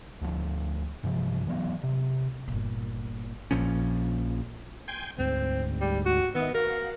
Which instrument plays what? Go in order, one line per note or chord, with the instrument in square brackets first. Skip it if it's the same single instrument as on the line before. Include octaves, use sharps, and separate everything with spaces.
[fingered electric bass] D2 F3 G#3 D4
G2 C3 F3
E3 F#3 B3
C3
[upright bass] G1 A#2
[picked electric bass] A#1 A#2 F3 C#4
[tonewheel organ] G5 G#5 C6
[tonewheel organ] D2 G#2 [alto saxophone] C4
[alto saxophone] G3
F#4
[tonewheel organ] D#3 D#5 E5 [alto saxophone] B3
[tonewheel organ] F#4 F5 [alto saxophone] A#4